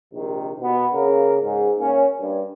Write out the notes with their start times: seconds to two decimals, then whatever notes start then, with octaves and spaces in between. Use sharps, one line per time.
0.13 A#1 C3 D#3
0.61 B2 B3
0.93 C#3 A#3 A#4
1.42 G#2
1.79 A#3 C#4
2.20 G2